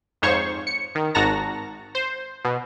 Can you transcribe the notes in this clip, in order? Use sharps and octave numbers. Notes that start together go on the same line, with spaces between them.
F2 G#2 C5 C#5 C#6
C#7
D#3
G#1 G#2 F#4 A5 A#5 A#6
C5
B2